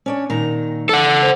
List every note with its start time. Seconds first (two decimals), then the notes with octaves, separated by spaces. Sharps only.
0.06 C#4 D4 C#5
0.30 A#2 D#3 A#5
0.89 E2 A4 F#5
1.22 C5